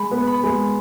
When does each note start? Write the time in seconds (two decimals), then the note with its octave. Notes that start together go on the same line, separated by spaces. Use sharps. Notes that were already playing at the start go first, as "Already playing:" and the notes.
Already playing: G#3 B5
0.11 B3
0.27 B5
0.44 G#3